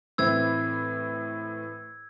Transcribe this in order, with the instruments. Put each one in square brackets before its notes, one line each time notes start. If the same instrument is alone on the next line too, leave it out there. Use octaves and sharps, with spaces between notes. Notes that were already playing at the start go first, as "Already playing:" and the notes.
[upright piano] A2 E3 C4 E4 [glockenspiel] E6 G#6